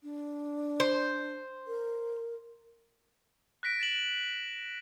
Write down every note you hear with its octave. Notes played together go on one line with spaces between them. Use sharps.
D4
C5
A#4
F#6 A#6 B6 D7
A6 E7 F#7